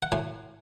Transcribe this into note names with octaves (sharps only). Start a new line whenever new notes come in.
F#5
A2 G#5